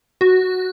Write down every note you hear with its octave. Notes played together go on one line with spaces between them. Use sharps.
F#4